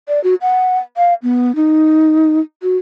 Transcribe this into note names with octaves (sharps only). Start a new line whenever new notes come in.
D5
F#4
F#5
F5
B3
D#4
F#4